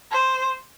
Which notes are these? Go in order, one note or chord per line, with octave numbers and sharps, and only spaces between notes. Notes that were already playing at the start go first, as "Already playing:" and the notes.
C5